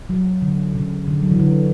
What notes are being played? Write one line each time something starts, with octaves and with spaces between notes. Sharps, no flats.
F#3
D3
C#3
D3
F#3
E3
D3